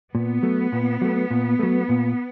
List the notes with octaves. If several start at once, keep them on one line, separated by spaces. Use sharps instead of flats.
A#2 B3
F#3 A3
A#2
F#3 A3
A#2
F#3 A3
A#2